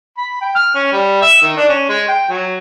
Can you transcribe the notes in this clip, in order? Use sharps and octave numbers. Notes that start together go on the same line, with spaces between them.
B5
G5
F6
C#4
G3
E5
D#3
D4
C#4
G#3
G5
F#3